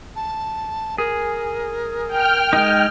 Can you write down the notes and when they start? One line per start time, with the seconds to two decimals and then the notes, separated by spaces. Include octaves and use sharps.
0.16 A5
0.98 G#4 A#4
2.08 G5 F6
2.53 G#3 D#4